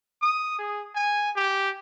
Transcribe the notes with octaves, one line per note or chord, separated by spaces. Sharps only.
D#6
G#4
G#5
G4